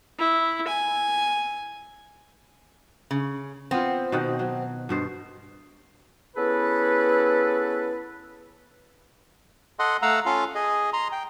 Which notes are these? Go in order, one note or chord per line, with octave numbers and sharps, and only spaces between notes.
E4
G#5
C#3
B3 C4 F4
B2 D#3 F#5
F#3
G2 B2 C5
B3 C#4 E4 G#4 A4 B4
A4 D#5 F#5 C6
A3 F5 F#5 A#5 E6
C#4 F4 A4 F5
G#4 D#5
A#5 C6
G5